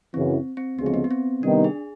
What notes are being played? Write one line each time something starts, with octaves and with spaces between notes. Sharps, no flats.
F#2 C#3 E3 C4
C4
D2 C#3 F3 G#3 B3
C4
B3
B3
C4
C3 D#3 G3 B3 D4 D#4
G#4